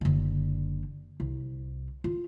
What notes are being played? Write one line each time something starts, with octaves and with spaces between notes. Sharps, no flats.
F#1 D3
C2
F4